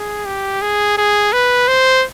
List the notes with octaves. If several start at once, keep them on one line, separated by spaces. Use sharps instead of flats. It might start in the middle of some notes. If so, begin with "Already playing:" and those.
Already playing: G#4
G4
G#4
G#4
B4
C5